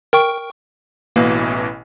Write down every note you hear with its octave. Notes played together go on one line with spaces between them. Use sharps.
A#4 G5 C#6
A1 B2 E3 A#3